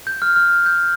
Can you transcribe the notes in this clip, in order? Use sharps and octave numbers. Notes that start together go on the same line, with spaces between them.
G6
F6
F6
G6